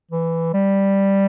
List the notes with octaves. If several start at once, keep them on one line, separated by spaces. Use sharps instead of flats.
E3
G3